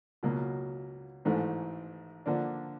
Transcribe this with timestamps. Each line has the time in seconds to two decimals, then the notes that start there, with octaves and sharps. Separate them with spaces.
0.23 C#2 B2 F#3 A#3
1.25 A1 G#2 E3 A3
2.26 D3 F3 A#3 D4